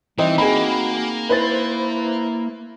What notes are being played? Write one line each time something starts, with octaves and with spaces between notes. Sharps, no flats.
E3 G3 C4 D#4
A#3 F#4 G#4 B5
E4 B4 C5 A6